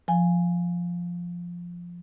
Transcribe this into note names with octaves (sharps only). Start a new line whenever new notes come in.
F3 G#5